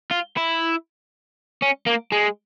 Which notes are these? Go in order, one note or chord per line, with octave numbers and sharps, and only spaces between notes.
F4
E4
C#4
A#3
G#3